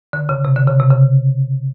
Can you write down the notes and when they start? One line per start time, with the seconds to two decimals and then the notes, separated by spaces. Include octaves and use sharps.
0.13 D3
0.29 C#3
0.45 C3
0.56 D3
0.68 C#3
0.79 C3
0.91 C#3